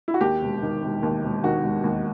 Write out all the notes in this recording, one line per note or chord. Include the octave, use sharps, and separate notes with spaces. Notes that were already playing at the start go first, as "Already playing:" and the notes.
E4
F#4
D#2 G4
E1
D#3
E1
D#2
E1
D#3 F#4
E1
D#2